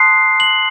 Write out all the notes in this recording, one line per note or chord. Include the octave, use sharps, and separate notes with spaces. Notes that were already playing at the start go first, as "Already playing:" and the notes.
Already playing: A5 C6 D#6 F#6 C7
F#7